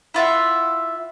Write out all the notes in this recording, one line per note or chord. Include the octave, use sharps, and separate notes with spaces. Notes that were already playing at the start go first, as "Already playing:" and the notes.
E4 F4 E5 F#5